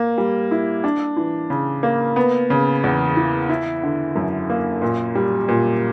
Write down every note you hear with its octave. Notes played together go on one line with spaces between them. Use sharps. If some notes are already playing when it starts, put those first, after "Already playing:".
Already playing: A#3
G3
E4
D4
E3
C#3
A#3
B3
C#3
E2
E3
E4
D3
F#2
A#3
A#2
G3
A#2